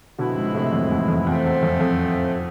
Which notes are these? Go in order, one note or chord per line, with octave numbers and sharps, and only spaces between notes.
B2 D3 F3 G#3 C4 E4 B4
G#2 B2
A2 C3
F2 A2
A2
E2 G#2
F2
E2 A2 F3 A3 C4
E2
F2
F2